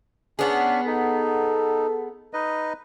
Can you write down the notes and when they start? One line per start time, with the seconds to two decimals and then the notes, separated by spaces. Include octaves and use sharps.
0.39 B3 C#4 D4 G#4
0.86 D#4 A4
2.33 D#4 B4 D#5